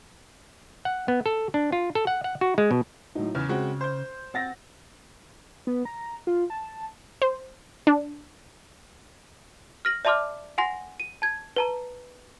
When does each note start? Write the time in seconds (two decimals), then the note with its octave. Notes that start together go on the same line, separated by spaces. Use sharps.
0.85 F#5
1.08 B3
1.26 A4
1.54 D4
1.72 F4
1.95 A4
2.07 F#5
2.24 F#5
2.41 F#4
2.58 G#3
2.71 B2
3.15 A2 F#3 D#4
3.35 E2 C#3 F6
3.49 G#3 C4 F#4
3.81 C5 G6
4.34 C4 F#5 A6 A#6
5.67 B3
5.85 A#5
6.27 F4
6.50 A5
7.22 C5
7.87 D4
9.85 F6 A#6 F#7
10.05 D5 E5 A5 C6 D6 F6
10.58 F#5 G#5 C6 A#6
11.00 D#7
11.22 A5 G#6
11.56 B4 A5 A#5